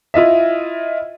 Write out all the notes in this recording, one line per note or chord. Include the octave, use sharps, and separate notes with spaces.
E4 F4 D#5 E5